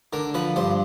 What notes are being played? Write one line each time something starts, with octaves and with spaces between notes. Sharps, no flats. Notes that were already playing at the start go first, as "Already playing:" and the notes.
D3 A#4
F3 B4
G2 C5